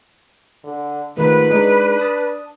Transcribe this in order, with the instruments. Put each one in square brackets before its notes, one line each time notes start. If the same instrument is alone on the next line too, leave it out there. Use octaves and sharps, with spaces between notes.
[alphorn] D3
[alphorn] G#2 [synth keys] D#3 F3 A3 [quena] B4
[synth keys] G#3 D#4 G#4 [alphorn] D4
[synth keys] A5 D#6